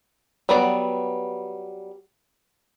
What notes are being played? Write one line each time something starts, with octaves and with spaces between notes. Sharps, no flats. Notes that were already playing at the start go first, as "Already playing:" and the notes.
F#3 G3 B3 F#4 D5